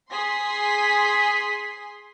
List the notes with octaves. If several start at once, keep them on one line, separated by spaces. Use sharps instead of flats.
G#4 C6 B6